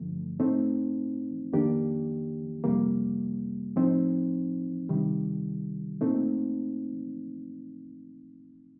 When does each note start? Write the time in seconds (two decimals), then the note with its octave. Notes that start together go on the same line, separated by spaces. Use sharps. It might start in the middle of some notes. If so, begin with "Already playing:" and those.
Already playing: G2 D3 F3 A3
0.39 A2 A3 C4 D#4
1.53 F2 D#3 A#3 D4 G4
2.64 F2 C3 G3 A#3
3.76 A2 F3 C4 D#4
4.89 C3 D#3 G3
6.01 A#2 A3 C4 D#4